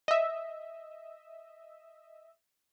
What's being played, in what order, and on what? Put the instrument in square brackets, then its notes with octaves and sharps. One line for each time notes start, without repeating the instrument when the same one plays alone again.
[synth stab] D#5 E5